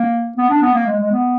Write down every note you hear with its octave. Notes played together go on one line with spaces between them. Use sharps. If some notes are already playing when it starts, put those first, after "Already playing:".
Already playing: A#3
B3
D4
B3
A#3
G#3
G#3
B3